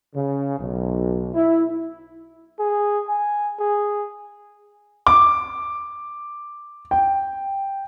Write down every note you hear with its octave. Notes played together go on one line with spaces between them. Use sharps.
C#3
B1
E4
G#4
G#5
G#4
D6
G5